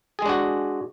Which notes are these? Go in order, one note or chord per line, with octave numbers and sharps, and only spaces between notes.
G#3 D4 F#4 G#4